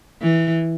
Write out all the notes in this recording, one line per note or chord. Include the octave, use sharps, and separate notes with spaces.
E3